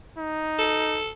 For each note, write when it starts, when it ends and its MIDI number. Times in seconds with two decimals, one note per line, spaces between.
0.18 1.00 63
0.59 1.09 69